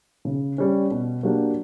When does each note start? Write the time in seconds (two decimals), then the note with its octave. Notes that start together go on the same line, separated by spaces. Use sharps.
0.25 C#3
0.58 G3 C#4
0.91 B2
1.23 F#3 A#3 D4 G4